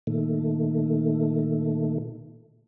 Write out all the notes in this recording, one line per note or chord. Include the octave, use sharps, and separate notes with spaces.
A#2 D#3 A3